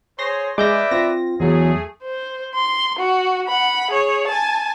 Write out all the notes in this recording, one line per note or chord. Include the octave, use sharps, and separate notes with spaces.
G#4 C5 C#5 C6 A#6
G#3 B4 D5 E5 D6 G6 A#6
C4 F4 A#6
E2 F#3 A3 G#4
C5
C6
F#4
F#5 B5
G#4 C#5
G#5 A5